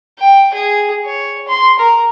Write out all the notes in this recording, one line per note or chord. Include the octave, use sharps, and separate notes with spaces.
G5
G#4
C#5
C6
A#4